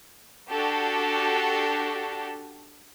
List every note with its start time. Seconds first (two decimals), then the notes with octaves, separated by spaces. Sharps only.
0.50 D4 F#4 G4 A4